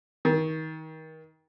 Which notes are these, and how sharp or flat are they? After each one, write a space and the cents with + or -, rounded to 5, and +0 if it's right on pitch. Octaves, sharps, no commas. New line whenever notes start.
D#3 +30